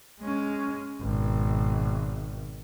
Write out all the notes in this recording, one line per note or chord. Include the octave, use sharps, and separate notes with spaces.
G#3 C#4
G#1 B2